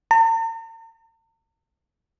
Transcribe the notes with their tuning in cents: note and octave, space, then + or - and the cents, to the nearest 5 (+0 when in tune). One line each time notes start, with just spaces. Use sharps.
A#5 -45